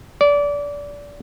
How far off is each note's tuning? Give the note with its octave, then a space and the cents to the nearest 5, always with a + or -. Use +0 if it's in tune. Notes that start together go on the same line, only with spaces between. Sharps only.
D5 -25